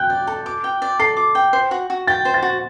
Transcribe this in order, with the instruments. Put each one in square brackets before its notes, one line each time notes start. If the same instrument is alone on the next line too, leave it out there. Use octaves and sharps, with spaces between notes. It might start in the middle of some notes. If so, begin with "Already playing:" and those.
Already playing: [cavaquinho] G5 [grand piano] F#6 G6
[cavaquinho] D5
A4
D6
G5
D5
[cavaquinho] A4 [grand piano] C7
[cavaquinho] D6
G5
C5
F#4
F#4
[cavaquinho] G5 [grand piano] A6
[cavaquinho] C5
[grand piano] A6
[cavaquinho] F#4